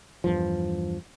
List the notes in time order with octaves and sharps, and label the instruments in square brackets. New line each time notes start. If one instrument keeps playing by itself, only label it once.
[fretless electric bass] E2 G2 F3